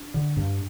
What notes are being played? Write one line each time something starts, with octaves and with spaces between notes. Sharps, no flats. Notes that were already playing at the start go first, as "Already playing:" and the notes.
Already playing: D4
D3
G2